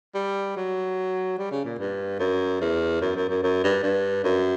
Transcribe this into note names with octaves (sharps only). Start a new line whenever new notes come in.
G3
F#3
G3
C#3
A#2
G2
F#2
E2
F#2
F#2
F#2
F#2
G2
G2
F#2